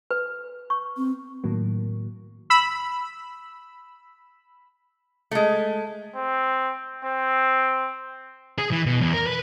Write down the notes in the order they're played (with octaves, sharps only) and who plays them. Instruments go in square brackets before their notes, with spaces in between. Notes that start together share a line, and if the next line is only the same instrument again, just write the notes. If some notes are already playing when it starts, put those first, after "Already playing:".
[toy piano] B4
C#6
[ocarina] C4
[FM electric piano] A2 D#3 F#3 A#3
[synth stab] B5 E6
[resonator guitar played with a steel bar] G#3 A3
[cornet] C4
C4
[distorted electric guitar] G#4
E3
B2
E2
A#4
B4